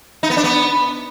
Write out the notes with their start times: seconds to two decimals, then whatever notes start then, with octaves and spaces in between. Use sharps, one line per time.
0.23 D#4
0.30 B3
0.37 D4
0.44 B3